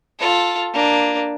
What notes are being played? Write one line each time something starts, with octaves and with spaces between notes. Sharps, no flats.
F4 A4
A#3 D4